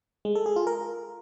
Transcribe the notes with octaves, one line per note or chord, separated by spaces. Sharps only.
G#3
A4
G#4
F4
A#4